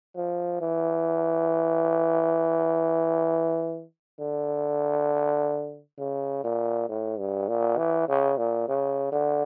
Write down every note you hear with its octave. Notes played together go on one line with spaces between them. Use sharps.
F3
E3
D3
C#3
A#2
A2
G2
A#2
E3
C#3
A#2
C#3
D3